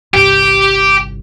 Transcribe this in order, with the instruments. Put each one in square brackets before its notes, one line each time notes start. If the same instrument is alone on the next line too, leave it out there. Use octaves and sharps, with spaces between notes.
[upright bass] G1 C2 [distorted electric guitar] G4